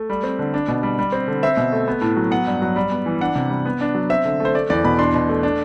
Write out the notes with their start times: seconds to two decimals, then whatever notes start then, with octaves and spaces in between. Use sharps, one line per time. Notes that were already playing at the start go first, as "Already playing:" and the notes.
Already playing: A3
0.10 G3
0.23 C4
0.39 D3
0.54 D4
0.68 B2
0.83 G3
0.99 G3
1.12 C4
1.28 D3
1.43 C4 E5
1.57 B2
1.72 A3
1.88 B3
2.01 A2
2.17 F#3
2.31 B3 F#5
2.47 G2
2.62 F#3
2.76 G3
2.91 B3
3.06 E3
3.21 D4 F#5
3.36 C3
3.50 G3
3.65 B3
3.81 D4
3.95 F#3
4.10 C4 E5
4.25 D3
4.40 A3
4.45 C5
4.54 A3 D5
4.70 E2 D5
4.84 B2 B5
4.99 D4 C6
5.14 B2
5.29 A3
5.43 D4